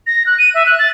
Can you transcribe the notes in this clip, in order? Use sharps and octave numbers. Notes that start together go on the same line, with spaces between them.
A#6
F#6
D#7
E5
F#6
A6